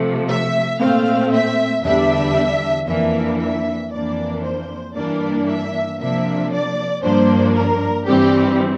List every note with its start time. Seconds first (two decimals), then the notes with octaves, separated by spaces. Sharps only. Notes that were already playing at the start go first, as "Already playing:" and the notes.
Already playing: C3 F3 A3
0.29 E5
0.79 A#2 A3 C4 F5
1.32 E5
1.83 E2 D3 G3 D4 E5
2.87 F2 E3 A#3 D4 E5
3.39 E5
3.91 F2 E3 A#3 D4 D5
4.43 C5
4.95 G2 E3 A#3 D4 D5
5.47 E5
5.99 C3 F3 A#3 D4 E5
6.51 D5
7.02 G2 F3 A#3 D4 C5
7.55 A#4
8.06 G2 E3 G3 C4 G4